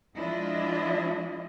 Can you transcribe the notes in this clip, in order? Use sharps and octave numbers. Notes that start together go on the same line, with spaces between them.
F3 G#3 D4 E4 F4 D#5